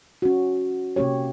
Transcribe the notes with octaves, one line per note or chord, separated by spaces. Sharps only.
C#4 F#4
C3 A#3 C#4 G4 C#5